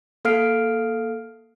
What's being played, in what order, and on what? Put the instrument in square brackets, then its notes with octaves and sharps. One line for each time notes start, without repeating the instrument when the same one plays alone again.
[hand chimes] A#3 A4 F5 F6 C7 D7